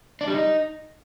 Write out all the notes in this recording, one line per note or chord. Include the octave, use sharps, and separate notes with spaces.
D4
G3
D#4